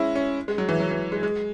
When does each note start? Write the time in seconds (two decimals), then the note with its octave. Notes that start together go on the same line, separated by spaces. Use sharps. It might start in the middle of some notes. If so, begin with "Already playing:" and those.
Already playing: G#3 C#4 E4
0.15 C#4
0.48 G#3
0.58 F#3
0.69 E3
0.80 F#3
0.91 E3
1.12 G#3
1.23 G#3